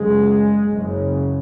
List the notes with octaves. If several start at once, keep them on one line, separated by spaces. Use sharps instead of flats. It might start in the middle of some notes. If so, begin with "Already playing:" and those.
Already playing: F#1 F#2 C#3 G#3
F#1 F#2 C#3